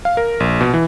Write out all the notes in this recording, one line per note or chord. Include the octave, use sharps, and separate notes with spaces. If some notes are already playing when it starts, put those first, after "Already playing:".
F5
A#4
A#1
B2
E3